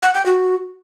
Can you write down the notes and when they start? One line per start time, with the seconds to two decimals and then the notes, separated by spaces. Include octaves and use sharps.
0.02 F#5
0.14 G5
0.26 F#4